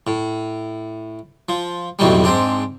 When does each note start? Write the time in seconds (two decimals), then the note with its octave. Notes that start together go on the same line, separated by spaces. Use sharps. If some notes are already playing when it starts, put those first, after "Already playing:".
0.07 A2
1.49 F3
1.99 B1 F2 A2 D#3 F#3 G3
2.24 G#2 C4 D4